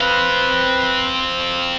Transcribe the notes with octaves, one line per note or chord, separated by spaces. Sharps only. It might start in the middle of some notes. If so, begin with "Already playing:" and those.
C4 B4 F5